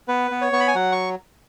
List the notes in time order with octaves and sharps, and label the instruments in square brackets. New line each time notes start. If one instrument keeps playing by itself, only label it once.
[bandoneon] B3 B4
B3
C#5
B3 C#6
B5
G#5
F#3 F#5
C#6